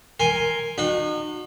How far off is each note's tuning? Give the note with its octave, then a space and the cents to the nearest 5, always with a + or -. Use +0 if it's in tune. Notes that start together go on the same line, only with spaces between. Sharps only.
A#4 +0 G#5 +0 C6 +5
D#4 -40 F#4 -25